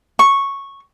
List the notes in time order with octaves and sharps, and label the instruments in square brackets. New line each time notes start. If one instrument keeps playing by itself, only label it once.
[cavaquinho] C#6